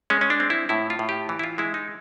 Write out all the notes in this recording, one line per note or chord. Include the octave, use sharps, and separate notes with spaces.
G#3 C#4
C#4
D4
C4
E4
A2 E4
F4
A2
G4
E3
E4
F4
G#3 E4
D#4